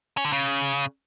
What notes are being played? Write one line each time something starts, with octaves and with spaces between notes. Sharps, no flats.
C#4
D3
C#3